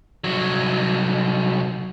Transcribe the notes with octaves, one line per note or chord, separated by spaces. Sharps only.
C2 F#3